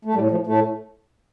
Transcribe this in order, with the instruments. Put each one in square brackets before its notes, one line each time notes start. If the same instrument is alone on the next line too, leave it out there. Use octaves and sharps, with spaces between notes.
[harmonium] A3
A2 G3
F3 A3
A2 A3